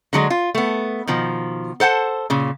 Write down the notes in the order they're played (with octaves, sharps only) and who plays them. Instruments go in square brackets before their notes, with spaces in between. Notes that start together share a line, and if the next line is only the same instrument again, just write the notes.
[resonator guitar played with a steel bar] D3 F#3 G#3 D4
F4
A3 B3
B2 D#3 F3
A4 C5 F#5 A5
A#2 C#3